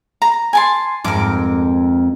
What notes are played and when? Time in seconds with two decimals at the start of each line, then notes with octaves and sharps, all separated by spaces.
0.22 A#5
0.53 G#5 A5 C6
1.04 F2 G#2 A#4 D6